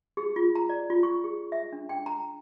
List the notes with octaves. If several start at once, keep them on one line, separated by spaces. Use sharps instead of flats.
G#4
F4
A#5
D5
F4
C#6
G#4
E5
D4
G5
A#5